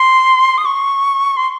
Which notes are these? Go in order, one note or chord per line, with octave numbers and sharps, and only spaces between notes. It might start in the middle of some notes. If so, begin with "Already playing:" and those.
Already playing: C6
D#6
C#6
C6